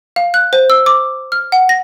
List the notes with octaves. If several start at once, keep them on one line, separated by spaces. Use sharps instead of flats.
F5
F#6
C5
E6
D6
F6
F#5
A#6